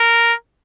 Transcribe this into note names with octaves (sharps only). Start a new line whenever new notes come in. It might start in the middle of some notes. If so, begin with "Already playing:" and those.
Already playing: A#4